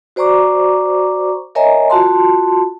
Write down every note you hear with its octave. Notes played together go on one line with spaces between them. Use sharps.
F#4 C5 D5 A#5 C#6 D6
A#4 C#5 D#5 E5 G#5 A#5
F4 F#4 A5 C6